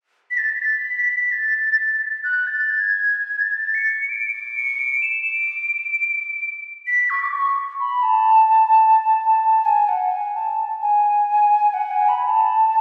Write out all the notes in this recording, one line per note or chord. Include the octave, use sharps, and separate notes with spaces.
B6
A6
B6
B6
A6
F#6
A6
G#6
A6
C#7
D7
D7
C#7
D7
E7
D7
B6
C#6
D6
C#6
B5
A5
G#5
F#5
G#5
A5
G#5
F#5
G#5
B5
A5